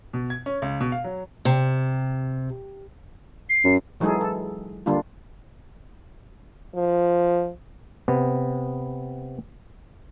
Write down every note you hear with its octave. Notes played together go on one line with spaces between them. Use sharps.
B2
G#6
C#4
C#2
B2
F5
F#3
C3
C7
F#2
E3 F#3 G#3 D#4 G#4 A4
A4
D3 G3 A#3 D4 F4
F3
C3 B3